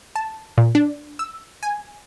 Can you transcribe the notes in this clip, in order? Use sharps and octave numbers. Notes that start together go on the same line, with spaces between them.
A5
A#2
D4
E6
G#5